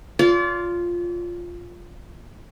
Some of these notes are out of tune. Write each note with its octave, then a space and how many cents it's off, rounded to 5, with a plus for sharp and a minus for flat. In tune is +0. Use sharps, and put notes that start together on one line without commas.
F4 +0 D5 -40